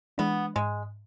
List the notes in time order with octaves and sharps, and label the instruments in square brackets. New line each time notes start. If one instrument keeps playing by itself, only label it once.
[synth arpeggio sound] E3 G#3 D4 [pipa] B3
[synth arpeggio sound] G#2 [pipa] G#3